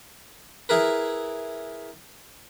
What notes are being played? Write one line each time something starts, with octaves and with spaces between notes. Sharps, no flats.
E4 G#4 A#4 B4